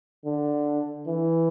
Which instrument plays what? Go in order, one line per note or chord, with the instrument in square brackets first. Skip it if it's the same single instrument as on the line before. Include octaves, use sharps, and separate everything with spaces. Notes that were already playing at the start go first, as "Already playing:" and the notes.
[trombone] D3
E3